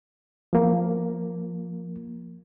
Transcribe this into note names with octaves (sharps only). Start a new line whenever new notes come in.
F3 A#3